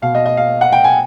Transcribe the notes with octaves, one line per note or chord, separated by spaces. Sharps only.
B2 F5
D#5
D#5
F5
F#5
G5
G#5